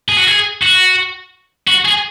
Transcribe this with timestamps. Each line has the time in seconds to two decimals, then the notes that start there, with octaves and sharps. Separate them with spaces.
0.09 G#4
0.18 F#4
0.27 G#4
0.62 F#4
1.67 F#4
1.85 G#4